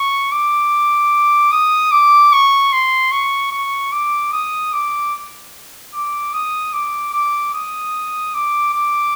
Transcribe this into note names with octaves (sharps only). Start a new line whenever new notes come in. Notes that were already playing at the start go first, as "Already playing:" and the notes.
Already playing: C#6
D6
D#6
D6
C#6
C6
C#6
C#6
D6
D#6
D6
D6
D#6
D6
D6
D#6
D6
D6